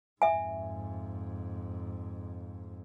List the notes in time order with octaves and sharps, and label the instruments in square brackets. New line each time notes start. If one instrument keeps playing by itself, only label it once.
[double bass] F2 G#2 [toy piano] E5 G#5